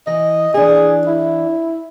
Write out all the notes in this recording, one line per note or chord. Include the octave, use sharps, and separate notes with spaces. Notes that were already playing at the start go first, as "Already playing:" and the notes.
E3 D#5
E3 D4 G#4
E4